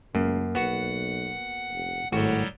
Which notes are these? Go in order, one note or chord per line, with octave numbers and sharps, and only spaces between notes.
C#2 F#2 A#3
B1 B3 F#4 F#5
F1
G#1 A2 F#3 G3 F#4